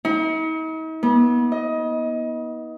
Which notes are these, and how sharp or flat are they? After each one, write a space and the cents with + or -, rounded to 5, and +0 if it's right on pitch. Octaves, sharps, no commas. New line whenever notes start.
D#4 +45
B3 -35
D#5 +20